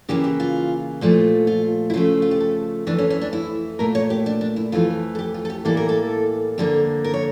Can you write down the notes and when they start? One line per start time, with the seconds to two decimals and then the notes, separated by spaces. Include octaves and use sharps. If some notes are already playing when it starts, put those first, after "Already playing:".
0.09 C#3 E3 A#3 G4
0.24 G4
0.40 F4
1.01 A#2 F3 A3
1.47 F4
1.90 E4
1.94 C#3 F3 A3 F4
2.22 F4
2.31 G4
2.40 A4
2.87 F2 E3 A3 D4
2.98 C#4
3.10 C#4
3.21 D4
3.33 E4
3.79 A#2 A3 A#4
3.95 C#5
4.10 G4
4.26 D4
4.41 D4
4.56 E4
4.72 F2 E3 A3 F4
5.15 A4
5.19 G4
5.34 F4
5.45 A4
5.50 G4
5.65 A2 E3 G3 A#3 A4
5.77 A#4
5.89 A4
6.58 F2 D3 G3 A#3
7.04 A#4
7.14 C#5